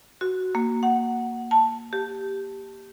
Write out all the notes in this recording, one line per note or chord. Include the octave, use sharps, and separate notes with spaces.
F#4
A#3
F#5
A5
G4